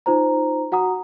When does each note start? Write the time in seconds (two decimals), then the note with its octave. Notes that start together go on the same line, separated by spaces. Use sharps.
0.06 D#4 F4 C5 A#5
0.72 F#4 F#5 A#5 D#6